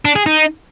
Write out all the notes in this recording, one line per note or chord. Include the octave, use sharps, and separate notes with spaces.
D4
G#4
D#4